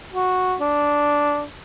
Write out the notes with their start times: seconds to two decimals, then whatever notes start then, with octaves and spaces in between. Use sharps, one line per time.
0.14 F#4
0.61 D4